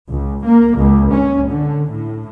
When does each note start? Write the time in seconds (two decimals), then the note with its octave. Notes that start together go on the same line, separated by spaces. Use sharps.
0.11 C#2
0.45 A#3
0.78 C#2
1.15 C#4
1.50 D3
1.91 A2